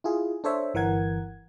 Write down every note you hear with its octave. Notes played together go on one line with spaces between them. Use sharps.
E4 F4 G#4
D4 A4 C5 C#5 E5
G1 E3 A#4 F#5 G#6